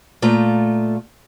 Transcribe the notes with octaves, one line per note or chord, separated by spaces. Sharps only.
A#2 A3 F4 A#5